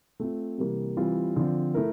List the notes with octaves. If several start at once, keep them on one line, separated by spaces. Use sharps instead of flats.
A3 C4 F4
C3 E3 G3 A#3
E3 G3 C4 F4
D3 F3 C4 F4
A3 E4 A#4